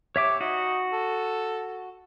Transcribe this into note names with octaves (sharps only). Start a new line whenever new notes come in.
G4 C#5 E5 D6
D#4 F#4
A4